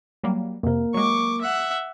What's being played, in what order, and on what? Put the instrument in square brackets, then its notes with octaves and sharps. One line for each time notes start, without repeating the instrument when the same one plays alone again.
[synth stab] F#3 G3 A#3
[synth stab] F2 C3 [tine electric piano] A#3 A#4
[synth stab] F#3 G#3 [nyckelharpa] C#6 D6
[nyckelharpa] E5 F#5